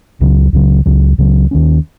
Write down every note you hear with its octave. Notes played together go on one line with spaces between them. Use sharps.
C#2 C#3 F#3
C#2 C#3 F#3
C#2 C#3 F#3
C#2 C#3 F#3
D#2 D#3 A#3 C#4